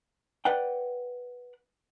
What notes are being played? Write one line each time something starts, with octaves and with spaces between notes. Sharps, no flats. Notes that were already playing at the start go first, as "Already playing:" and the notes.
B4 D5 F#5 G5